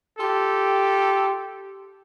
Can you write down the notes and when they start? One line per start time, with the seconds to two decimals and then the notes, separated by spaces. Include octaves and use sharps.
0.19 F4 G4 A4